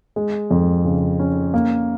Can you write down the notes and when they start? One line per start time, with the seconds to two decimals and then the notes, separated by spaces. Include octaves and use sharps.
0.16 G#3
0.51 F2
0.85 C#3
1.19 C#4
1.54 A#3